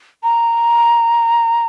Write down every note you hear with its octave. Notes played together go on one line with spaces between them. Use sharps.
A#5